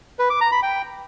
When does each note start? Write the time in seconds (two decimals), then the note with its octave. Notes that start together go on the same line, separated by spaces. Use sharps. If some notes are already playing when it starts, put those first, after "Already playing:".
0.19 B4
0.30 D6
0.41 A#5
0.52 B5
0.63 G5